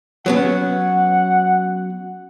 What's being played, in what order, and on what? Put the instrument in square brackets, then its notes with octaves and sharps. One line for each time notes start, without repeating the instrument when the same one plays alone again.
[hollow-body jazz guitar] F#3 B3 C#4 [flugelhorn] F#5